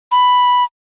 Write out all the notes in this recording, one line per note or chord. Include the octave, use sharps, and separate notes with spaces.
B5